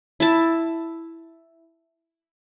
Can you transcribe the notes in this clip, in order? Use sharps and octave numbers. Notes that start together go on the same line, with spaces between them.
E4 A5